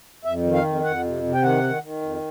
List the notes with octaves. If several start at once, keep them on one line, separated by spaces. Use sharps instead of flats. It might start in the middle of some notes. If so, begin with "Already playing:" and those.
F2 E5
D#3
F5
F2
F2 F#5
C3
C3
G5
D#3 F#5
D#3
D#3
F2